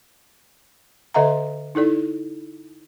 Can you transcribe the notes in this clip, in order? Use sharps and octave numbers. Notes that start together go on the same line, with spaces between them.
D3 A4 D#5 E5 F#5 A#5
D#4 E4 A4 D5